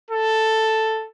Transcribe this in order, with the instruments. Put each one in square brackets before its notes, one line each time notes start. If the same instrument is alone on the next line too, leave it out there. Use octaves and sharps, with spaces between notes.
[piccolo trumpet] A4